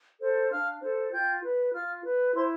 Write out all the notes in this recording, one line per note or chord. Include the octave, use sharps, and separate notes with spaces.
A4 C5
D4 F5 F6
A4 C5
F4 G5 G6
B4
F4 F5 F6
B4
E4 C5 C6